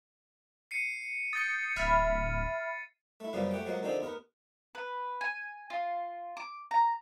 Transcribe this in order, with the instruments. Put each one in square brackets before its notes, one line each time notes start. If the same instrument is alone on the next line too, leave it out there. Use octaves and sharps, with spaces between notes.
[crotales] C7 C#7 D#7
[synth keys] D#6 G6 C#7 [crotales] A6
[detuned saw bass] D1 [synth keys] E5 B5 F6 [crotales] A6
[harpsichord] A3 E4
F#2 C#3 F3 G3 A#3 B3
A3 G4 F#5 G5
F3 F#3 G#3 A#3 F#5
D3 D#3 F3 C4 G4
D#2 B3 A#4 F#5
[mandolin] B4
G#5
F4
D6
A#5